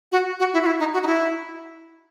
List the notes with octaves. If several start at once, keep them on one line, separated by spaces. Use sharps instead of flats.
F#4
F#4
E4
F#4
E4
D#4
F#4
D#4
E4